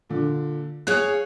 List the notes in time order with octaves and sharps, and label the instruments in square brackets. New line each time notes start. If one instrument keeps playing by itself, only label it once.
[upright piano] A#2 D3
[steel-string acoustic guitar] G#4 C#5 F5 [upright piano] F#6